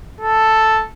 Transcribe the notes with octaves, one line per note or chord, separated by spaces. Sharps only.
A4